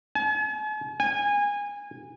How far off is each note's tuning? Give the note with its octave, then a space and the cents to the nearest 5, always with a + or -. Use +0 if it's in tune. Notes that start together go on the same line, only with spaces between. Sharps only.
G#5 +45
G#5 -25